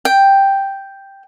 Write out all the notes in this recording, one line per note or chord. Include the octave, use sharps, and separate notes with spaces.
G5